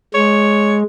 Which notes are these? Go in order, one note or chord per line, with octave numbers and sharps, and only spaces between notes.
G#3 C#5